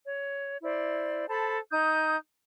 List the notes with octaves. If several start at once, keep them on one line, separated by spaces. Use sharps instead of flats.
C#5
E4 C5 D5
A4 C5 A5 B5
D#4 D#6 G6